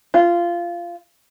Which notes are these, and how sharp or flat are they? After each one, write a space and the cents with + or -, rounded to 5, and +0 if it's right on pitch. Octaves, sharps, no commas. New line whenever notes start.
F4 -15